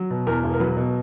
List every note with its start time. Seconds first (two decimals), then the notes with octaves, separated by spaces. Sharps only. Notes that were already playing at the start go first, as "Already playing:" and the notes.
Already playing: F#3
0.11 B2
0.27 E2 A#4
0.43 E1
0.53 A#4
0.60 F#3 B4
0.77 B2